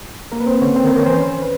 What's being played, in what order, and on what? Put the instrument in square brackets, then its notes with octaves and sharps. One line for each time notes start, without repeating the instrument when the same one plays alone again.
[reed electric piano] A#3 A#4
B4
C4 C5
[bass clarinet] D3 [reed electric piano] C#4 C#5
[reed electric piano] C4 C5
[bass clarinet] D#3
[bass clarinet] D#3 [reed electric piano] C#5
[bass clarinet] E3 [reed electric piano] C5
[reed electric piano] C#4 C#5
B4